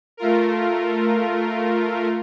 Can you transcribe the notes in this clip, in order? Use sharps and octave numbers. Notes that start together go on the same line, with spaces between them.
A3 F4 A#4